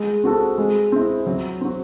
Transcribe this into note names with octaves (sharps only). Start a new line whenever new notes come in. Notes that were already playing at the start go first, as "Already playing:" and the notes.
Already playing: G#3
C4 F#4 A4
G#3
C4 E4
F#3
C4 F#4